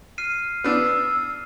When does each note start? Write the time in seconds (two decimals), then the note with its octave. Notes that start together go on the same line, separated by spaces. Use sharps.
0.18 F6 C7 D#7
0.64 B3 D4 E6